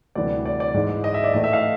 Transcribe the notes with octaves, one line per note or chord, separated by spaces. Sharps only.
D2 C3 E3 G3 D5
D5
D5
G#2 E3 G#3
D#5
E5
D5
A2 E3 A3 D#5
E5
F5